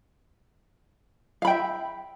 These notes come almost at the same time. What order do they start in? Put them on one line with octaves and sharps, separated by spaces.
F5 B5 G5 E5